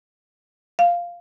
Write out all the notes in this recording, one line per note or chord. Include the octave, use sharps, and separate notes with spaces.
F5